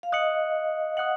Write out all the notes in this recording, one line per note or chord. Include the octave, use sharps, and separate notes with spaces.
F5
D#5 D#6 F#6 C#7 F#7
F#5 D#6 F#6 C#7 F#7